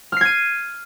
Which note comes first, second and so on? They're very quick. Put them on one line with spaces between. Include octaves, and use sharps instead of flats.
F6 C7 G#6 D#7